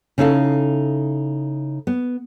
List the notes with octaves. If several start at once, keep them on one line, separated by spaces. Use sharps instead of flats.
C#3 D#4 E4 A4 F5
B3